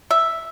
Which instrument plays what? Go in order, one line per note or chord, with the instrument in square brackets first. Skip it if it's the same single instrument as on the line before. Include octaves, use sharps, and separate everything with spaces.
[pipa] E5